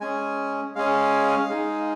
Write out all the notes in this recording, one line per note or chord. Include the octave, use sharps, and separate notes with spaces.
G#3 C#4 G#4 G#5
G#3 C#4 G#4 F5
G#3 D#4 G#4